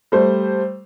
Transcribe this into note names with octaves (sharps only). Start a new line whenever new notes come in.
G3 A3 C5